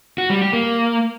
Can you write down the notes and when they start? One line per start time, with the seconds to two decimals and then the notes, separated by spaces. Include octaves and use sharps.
0.18 F#4
0.30 G3
0.42 G4
0.53 A#3